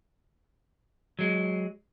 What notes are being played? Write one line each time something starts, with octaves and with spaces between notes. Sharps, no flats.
F#3 G#3